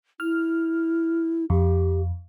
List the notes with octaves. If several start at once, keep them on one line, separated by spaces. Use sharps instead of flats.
E4 F6
F2 G4